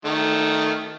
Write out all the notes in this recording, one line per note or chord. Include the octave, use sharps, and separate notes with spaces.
D#3 A3